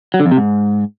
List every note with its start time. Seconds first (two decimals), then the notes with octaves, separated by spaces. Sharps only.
0.14 F#3
0.20 D3
0.26 F2
0.31 C3
0.37 G#2